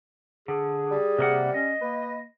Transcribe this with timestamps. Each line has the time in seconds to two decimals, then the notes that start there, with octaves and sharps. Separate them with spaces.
0.48 D3 G#4
0.91 G3
1.19 C3 A#3 F#5
1.54 C#4 D#5
1.82 A#3 B4